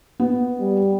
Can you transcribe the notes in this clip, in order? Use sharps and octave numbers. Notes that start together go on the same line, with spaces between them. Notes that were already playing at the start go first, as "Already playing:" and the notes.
B3
G3